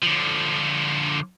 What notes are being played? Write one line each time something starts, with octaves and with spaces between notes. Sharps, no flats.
D3 F3